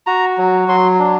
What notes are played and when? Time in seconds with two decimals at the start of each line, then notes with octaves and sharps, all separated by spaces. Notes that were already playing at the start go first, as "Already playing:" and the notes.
0.07 F#4 A#5
0.38 F#3
0.68 F#3 C6
0.99 D4